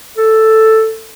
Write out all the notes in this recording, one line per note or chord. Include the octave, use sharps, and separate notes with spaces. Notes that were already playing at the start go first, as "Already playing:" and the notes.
A4